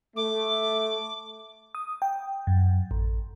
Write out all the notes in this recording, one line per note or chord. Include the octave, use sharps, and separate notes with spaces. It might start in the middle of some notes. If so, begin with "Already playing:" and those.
A3 D6
D#6
G5
F#2
A1